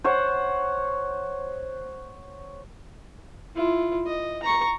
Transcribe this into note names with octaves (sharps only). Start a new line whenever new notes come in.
C5 C#5 F#5
E4 F4
D#5
A#5 C#6